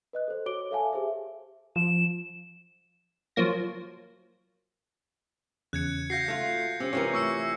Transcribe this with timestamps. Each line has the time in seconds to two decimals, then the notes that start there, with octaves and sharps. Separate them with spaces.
0.13 B4 D#5 F#6
0.28 A4 C5
0.46 F#4 C#5 D6 D7 G7
0.71 A4 E5 F5 G#5 A5
0.93 G4 G#4 C5 E5
1.76 F3 E7
3.36 F3 F#3 A#3 A#6
5.73 E2 C#3 F#6 G#6 C#7
6.10 F#4 F5 G6 A#6 C7
6.28 A3 F4
6.80 C3 C4 C#4
6.93 C3 E3 F4 A#4 C#5
7.13 A3 C#6 E6 C#7